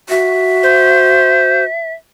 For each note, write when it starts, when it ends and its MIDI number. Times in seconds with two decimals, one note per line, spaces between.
0.09 1.63 66
0.09 1.93 76
0.63 1.65 72